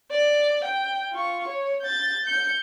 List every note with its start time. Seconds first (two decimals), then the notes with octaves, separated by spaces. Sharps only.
0.11 D5
0.64 G5
1.12 F4 C#6
1.47 C#5
1.81 G6 A6
2.23 G6 C#7